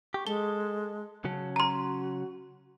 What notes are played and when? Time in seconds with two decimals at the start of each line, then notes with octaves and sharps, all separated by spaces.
0.14 G4 C#6
0.27 G#3 A4 G7
1.25 C#3 F#3 C#4 A5
1.56 F#4 A#5 C6